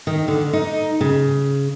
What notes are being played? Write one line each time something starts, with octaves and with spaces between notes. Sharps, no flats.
D#3
D3
D#4
C#3